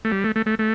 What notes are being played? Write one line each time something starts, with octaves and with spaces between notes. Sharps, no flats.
A3
G3
A3
A3
A3
A3